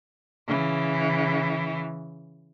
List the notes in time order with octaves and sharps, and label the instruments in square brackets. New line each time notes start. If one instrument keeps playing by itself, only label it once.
[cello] C#3 E3